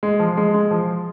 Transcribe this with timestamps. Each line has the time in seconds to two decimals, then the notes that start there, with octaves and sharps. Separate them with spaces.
0.03 G#3
0.19 F3
0.37 G#3
0.54 G#3
0.71 F3